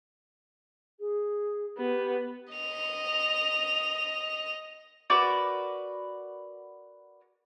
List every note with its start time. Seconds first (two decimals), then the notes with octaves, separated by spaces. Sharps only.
0.99 G#4
1.78 B3 G4
2.54 D#5 F7
5.10 F#4 A#4 B4 D5